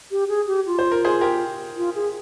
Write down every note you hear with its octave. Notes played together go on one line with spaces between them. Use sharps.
G4
G#4
G4
F4
C5
A#4
G#4 C5
G4 A#4
F4
G#4